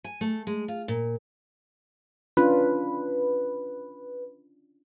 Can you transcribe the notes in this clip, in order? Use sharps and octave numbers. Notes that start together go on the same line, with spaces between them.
G#5
A3
G#3
F4
A#2
C#4 D4 F4 B4